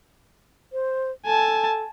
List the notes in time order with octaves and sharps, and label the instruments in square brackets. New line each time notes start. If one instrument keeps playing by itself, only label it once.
[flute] C5
[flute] A4 [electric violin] G#5 A5